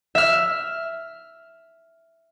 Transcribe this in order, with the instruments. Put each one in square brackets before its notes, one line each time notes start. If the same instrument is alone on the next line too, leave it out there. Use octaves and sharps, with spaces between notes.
[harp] E5 F6